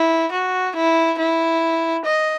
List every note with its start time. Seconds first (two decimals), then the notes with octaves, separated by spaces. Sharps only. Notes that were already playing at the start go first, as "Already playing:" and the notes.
Already playing: E4
0.32 F#4
0.75 E4
1.19 E4
2.05 D#5